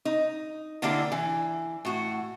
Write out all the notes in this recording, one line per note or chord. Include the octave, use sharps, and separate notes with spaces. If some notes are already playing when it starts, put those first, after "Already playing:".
D#4
D3 A#3 D4 E4 G4
E3
A2 F#4